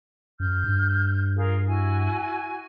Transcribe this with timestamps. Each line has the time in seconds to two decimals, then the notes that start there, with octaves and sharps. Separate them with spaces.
0.40 F#2 F6 G6
0.64 G2
1.36 F4 G#4 A#4
1.67 E4 F#4 G#5